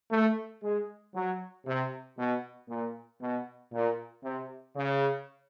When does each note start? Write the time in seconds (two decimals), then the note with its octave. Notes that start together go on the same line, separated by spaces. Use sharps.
0.11 A3
0.63 G#3
1.15 F#3
1.66 C3
2.18 B2
2.69 A#2
3.21 B2
3.73 A#2
4.23 C3
4.75 C#3